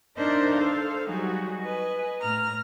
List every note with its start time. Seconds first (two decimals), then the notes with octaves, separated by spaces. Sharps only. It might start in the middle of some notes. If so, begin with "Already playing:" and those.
0.17 D4 D#4 A#4 C5 D#5 E5
0.55 A4 C5 F5
1.06 F#3 G3 D#4 F#4 G#4
1.61 B4 D#5 G#5
2.21 A2 A#5 F6